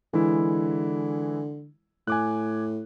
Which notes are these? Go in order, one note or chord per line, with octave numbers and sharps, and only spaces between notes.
D3 E3 G#3 E4
A2 G#5 D6 F#6